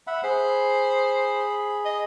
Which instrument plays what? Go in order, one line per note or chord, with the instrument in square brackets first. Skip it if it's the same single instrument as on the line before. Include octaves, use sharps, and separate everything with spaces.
[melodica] E5 F#5 B5
[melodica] G#4 B5 [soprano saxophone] C5
[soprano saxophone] D#5